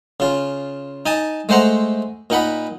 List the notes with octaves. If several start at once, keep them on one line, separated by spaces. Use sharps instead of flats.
C#3 F4
D#4 G#5 A5
G#3 A3 C5 F#5 A#5
A#2 D#4 F#5 B5